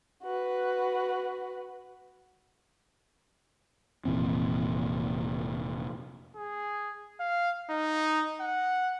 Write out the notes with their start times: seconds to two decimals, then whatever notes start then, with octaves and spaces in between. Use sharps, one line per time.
0.23 F#4 B4
4.05 F1 A#2 E3 C4
6.36 G#4
7.20 F5
7.70 D#4
8.41 F#5